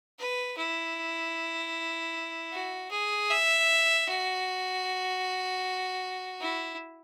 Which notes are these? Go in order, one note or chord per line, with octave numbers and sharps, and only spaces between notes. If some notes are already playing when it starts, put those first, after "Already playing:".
B4
E4
F#4
G#4
E5
F#4
E4